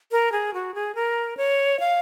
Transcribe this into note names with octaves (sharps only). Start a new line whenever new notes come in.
A#4
G#4
F#4
G#4
A#4
C#5
F5